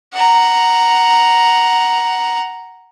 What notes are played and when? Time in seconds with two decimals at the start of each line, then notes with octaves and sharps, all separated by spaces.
0.14 F#5 A#5